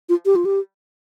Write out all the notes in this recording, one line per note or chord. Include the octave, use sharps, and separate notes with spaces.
F4
G4
F4
G4